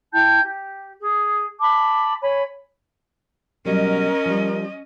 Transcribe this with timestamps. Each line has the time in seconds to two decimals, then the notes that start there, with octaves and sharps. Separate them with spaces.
0.13 E4 G5 A5 G6
0.44 G4
1.02 G#4
1.60 A5 B5 D6
2.22 C#5 G#5 B5
3.65 B2 F#3 G3 C#4 A#4 D#5
4.25 F3 G3